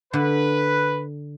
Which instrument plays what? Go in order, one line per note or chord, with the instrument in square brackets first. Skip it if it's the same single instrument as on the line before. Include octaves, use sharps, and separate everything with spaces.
[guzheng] D3 [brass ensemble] B4